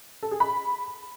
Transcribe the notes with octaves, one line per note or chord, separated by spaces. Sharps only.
A4
G#4
B5